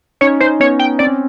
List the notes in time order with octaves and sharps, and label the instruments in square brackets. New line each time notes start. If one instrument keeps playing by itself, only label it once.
[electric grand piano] C#4 D#4 [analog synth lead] C#5
[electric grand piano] C#4 D#4 [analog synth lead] C5
[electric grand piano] B3 C#4 [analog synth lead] C#5
[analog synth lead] G5
[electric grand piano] C4 [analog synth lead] D5
[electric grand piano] C#4